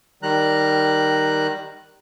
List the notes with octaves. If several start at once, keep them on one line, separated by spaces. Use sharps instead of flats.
D#3 G3 A#5 F#6